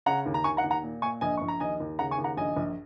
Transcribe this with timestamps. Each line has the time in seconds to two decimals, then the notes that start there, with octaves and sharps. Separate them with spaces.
0.06 C#3 F#5 A#5
0.26 D#2
0.34 A#5
0.44 D#2 G#5 C#6
0.57 F#5 A#5
0.64 D#2
0.71 F#5 A#5
0.83 A#2
1.02 A#2 G#5 C#6
1.21 A#1 D#5 G#5
1.37 A#1 C#6
1.48 A#5
1.60 D#2 D#5 G#5
1.80 D#2
1.99 C#3 F#5 A#5
2.11 G#5 C#6
2.18 D#2
2.24 F#5 A#5
2.37 A#1 D#5 G#5
2.56 A#1